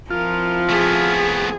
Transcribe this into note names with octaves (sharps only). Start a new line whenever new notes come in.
F3 C4 E4 F4 A#4
A3 B3 G#4